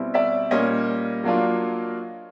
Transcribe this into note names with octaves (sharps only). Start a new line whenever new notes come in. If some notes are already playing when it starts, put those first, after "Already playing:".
Already playing: B2 G3 C4 E4
D5 E5
A#2 G3 A#3 C#4 C#5 D#5
F#3 A#3 D4 F4